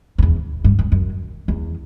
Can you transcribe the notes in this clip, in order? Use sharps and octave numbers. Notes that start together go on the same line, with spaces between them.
F2
E2
G2
F#2
F#2
E2